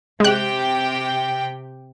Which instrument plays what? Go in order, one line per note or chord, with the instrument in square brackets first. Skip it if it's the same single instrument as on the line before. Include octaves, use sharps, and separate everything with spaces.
[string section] C3 G4 G5 [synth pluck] G#3 F#6